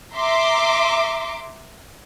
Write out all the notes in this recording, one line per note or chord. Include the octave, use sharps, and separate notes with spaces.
E5 A#5 C6 D6